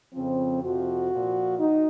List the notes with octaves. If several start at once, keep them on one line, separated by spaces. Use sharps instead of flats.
F2 C#3 F3 C4
F2 C3 F3 F#4
A#2 F3
D#3 D#4